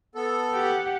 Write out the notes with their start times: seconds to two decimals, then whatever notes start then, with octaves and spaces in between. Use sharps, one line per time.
0.15 B3 A4
0.53 G4 F#5